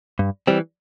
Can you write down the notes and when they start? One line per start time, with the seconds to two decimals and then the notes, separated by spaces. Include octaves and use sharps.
0.19 G2
0.47 E3 G3 C4